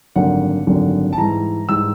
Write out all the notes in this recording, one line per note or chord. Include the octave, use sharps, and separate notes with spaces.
G#1 F#2 D3 G3 A#3 F#5
G#1 F#2 D3 G3 A#3
A5
G#2 E3 G3 A#5
G#2 E3 G3 E6